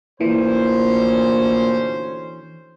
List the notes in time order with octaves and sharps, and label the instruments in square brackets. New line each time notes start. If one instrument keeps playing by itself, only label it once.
[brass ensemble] D2 C#4 C5 [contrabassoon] A#2 [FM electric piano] E3